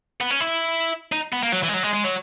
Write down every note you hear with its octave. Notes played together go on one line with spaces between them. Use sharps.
B3
C#4
E4
D#4
B3
A#3
F#3
E3
G#3
F#3
G#3
G#3
F#3